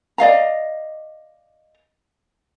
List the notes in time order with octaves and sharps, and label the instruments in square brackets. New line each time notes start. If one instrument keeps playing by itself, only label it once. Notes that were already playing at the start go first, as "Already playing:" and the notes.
[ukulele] D5 D#5 F5 A#5